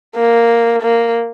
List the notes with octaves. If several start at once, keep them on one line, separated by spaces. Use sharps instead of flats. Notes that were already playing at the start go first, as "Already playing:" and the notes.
A#3
A#3